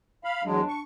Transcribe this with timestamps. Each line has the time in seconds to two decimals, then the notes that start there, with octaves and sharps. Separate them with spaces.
0.24 F5 B5
0.44 E2 F#3 G#3 D4
0.68 C#6